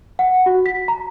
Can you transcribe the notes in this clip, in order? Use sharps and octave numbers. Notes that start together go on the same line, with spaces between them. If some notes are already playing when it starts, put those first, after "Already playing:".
F#5
F#4
B6
A#5